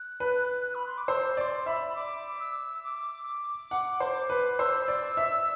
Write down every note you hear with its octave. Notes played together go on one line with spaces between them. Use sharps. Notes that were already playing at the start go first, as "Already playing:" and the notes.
Already playing: F#6
B4
B5
C6
D6
C5 E6
D5 C6 D6
E5 B5
D6
E6
D6
F#5
C5
B4
C5 E6
D5
E5